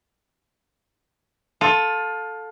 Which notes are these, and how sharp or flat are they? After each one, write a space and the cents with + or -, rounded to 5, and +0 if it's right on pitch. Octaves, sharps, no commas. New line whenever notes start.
F4 +25 A4 +0